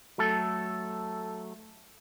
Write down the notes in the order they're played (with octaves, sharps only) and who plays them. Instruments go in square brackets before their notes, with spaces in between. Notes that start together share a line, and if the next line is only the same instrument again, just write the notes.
[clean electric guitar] F#3 A3 A4